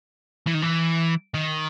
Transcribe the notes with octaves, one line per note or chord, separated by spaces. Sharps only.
E3
D#3
E3
D#3